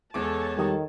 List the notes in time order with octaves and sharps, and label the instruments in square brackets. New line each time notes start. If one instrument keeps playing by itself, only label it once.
[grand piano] E2 G#3 D6 [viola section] A4 C#5 A5
[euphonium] D#3 [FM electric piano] G3 G4 D#5